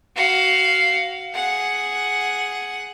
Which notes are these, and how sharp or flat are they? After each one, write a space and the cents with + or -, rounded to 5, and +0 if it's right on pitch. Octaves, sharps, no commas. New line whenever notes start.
F#4 +20 F5 +0
G#4 +0 F#5 +0